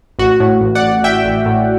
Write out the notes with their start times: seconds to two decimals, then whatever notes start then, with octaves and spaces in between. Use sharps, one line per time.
0.19 A1 F#4
0.40 A2
0.61 A1
0.75 D5 F#5
0.83 A1
1.03 A1 E5 G5
1.25 A1
1.46 A2